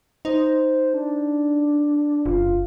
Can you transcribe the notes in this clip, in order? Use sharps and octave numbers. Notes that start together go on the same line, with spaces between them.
D#4 C5
D4
F#1 F4